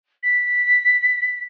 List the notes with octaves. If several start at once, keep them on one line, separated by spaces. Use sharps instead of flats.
B6